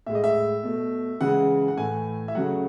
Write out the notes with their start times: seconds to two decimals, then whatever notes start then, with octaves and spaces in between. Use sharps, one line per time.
0.06 A2 G#3 E5
0.15 D#5
0.24 E5
0.63 B2 A3
1.21 C#3 E3 G#3 F#5
1.68 F#5
1.77 A2 E3 A3 G#5
2.28 E5
2.35 C#3 F#3 A3 F#5